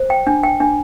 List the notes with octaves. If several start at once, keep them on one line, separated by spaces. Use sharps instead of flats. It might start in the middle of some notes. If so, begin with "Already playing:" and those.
Already playing: C5
G5
D4
G5
D4